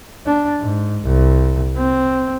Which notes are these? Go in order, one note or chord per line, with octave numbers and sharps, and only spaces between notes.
D4
G#2
C2
C4